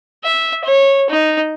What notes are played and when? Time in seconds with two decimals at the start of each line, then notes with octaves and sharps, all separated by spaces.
0.24 E5
0.64 C#5
1.09 D#4